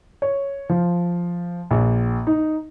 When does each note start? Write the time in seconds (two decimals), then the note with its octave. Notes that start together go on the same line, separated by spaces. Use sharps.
0.22 C#5
0.69 F3
1.71 A#1
2.27 D#4